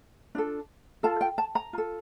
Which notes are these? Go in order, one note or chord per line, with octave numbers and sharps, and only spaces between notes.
D4 F4 A4
F4 A4 A5
G5
A5
A#5
F4 A4